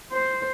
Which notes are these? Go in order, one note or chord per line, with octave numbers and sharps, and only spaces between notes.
C5